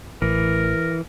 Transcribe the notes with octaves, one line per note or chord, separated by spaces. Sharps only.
A1 E3 A#4